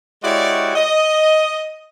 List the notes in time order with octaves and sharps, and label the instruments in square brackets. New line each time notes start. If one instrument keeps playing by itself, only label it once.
[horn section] G#3 E4 F#4 G4 C#5 D5
D#5